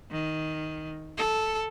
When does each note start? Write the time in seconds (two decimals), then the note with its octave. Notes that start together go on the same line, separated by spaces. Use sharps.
0.11 D#3
1.18 A4